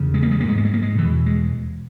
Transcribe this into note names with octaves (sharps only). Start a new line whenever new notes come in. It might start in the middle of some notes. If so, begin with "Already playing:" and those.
Already playing: E2 C#3
G#3
A#3
G#3
G#2 A#3
G#3
A#3
G#3
A#3
G#3
E2 B2 E3
G#3